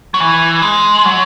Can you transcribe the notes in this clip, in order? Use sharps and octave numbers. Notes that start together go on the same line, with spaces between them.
F#3
E3
G#3
F#3